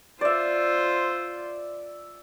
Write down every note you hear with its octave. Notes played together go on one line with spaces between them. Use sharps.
F4 C5 D5 E5